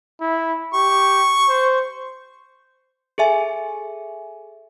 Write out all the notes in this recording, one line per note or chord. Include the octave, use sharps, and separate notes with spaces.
E4
G4 C#6
C5
G#4 A4 E5 G#5